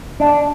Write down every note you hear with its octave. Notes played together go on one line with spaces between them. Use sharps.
D4